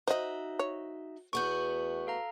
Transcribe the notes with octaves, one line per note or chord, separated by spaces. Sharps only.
D#4 F#4 C5 D#5 E5
C#5
E2 A3 B3 F#4 C#6 G6
A4 F5 A#5